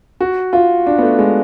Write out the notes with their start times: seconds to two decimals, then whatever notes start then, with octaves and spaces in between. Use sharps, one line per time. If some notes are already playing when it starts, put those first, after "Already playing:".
0.20 F#4
0.53 F4
0.87 D4
0.98 B3
1.02 A3
1.19 G#3